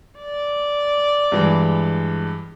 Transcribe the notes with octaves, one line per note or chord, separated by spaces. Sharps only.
D5
G2 E3 G#3